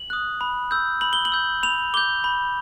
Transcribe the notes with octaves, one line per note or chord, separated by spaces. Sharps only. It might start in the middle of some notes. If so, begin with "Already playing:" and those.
Already playing: F#7
D#6 F#6
B5
E6 G6
B5 F#7
G7
F#7
E6 G6
B5 F7
D6 G6 G7
B5